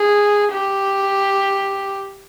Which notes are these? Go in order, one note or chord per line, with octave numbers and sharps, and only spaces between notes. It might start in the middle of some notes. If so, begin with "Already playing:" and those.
Already playing: G#4
G4